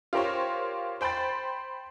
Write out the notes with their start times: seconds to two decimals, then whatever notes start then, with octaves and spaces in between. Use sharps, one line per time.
0.13 F4 G4 A#4 C5 C#5
1.01 C5 G5 B5 C6 A6